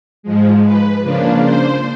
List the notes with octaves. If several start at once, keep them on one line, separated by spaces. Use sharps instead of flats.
G#2 F3 G#3
B4
C#3 F3 A#3 D4
C5